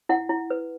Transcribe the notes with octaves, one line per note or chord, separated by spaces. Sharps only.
E4 F#5
E4
B4